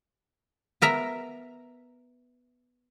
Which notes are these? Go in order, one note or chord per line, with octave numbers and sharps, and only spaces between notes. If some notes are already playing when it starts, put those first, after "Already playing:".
B3 A#4 E5 A#5